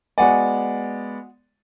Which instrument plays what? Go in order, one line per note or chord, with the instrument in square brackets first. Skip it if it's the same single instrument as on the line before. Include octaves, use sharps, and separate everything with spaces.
[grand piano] G#3 B3 D5 [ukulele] F#4 F#5 G#5